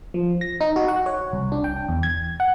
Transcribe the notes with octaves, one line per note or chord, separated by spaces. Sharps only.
F3
A#6
D#4
F#4
F#5
C#5
C2
D4
G5
E2
G#6
F#5